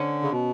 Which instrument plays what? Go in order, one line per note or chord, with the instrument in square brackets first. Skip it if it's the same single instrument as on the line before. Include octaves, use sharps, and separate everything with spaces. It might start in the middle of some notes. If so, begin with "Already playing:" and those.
Already playing: [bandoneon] D3 [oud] C#4
[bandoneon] C#3
B2